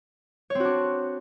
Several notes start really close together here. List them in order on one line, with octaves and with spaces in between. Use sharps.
C#5 C4 F#4 D4